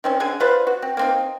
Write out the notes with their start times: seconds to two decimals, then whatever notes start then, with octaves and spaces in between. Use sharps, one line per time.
0.04 D#3 C4 C#4
0.20 D3 G#4 G#5
0.40 F4 B4 C5 D5
0.67 F#4
0.82 C4
0.97 A#3 C4 D#4